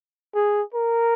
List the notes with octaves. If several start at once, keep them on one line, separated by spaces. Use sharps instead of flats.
G#4
A#4